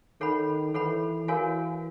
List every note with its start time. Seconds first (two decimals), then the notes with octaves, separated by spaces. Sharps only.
0.20 D#3 A4 C#5 F#5 B5
0.74 E3 A4 C#5 F#5 B5
1.28 E3 F#4 A#4 C#5 F5 G#5